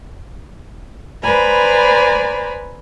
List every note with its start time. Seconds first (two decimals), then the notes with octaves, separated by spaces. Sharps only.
1.22 B4 C5 D5 G#5 A#5 B5